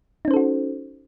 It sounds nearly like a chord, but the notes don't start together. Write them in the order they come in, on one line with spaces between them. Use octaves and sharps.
D#4 C#4 C5 A4 F#4